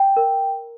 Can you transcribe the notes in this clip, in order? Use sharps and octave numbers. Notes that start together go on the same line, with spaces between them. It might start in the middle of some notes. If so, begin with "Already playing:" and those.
Already playing: G5
A#4